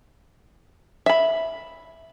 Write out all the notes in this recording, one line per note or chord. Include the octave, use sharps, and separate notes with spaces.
E5 B5